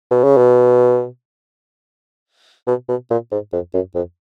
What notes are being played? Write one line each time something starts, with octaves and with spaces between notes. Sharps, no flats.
B2
C#3
B2
B2
B2
A#2
G#2
F2
F#2
F2